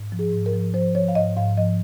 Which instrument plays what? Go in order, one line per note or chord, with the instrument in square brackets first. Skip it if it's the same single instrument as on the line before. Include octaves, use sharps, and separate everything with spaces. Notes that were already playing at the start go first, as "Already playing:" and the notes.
Already playing: [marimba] G#2
F3
G#4
G#2
A#4
F3
F3 C5
F3 C#5
F5
G#2 D#5
G#2 F5
F3 D#5